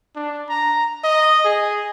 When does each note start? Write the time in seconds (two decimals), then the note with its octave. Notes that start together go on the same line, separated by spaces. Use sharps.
0.16 D4
0.49 A#5
1.04 D#5
1.45 G#4